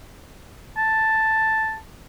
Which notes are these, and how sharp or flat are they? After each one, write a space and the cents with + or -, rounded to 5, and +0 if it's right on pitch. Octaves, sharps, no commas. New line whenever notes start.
A5 +5